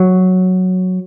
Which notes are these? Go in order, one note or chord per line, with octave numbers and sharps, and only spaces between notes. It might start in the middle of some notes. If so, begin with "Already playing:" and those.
Already playing: F#3